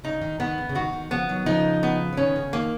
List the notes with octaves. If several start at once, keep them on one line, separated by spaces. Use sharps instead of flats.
C#3 D#4
D#3
D#3 B3
C#3
C#3
D#3 F#4
D#3
C#3 F3 B3
D#3 F#3
C#3 F3 D#4
B3
F3
D#3 C#4
C#3
D#3 A#3